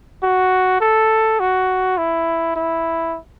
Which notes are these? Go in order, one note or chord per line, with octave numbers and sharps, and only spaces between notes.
F#4
A4
F#4
E4
E4